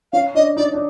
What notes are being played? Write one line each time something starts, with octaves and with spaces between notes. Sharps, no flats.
C#4 F5
D4 D#5
D#4 D5
D4